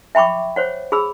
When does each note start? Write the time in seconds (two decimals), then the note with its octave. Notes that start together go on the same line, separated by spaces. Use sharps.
0.15 E5 G5 B5 C#6 D6
0.56 C5 C#5 F#5
0.92 G#4 B5 E6